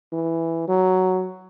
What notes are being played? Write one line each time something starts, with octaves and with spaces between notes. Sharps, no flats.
E3
F#3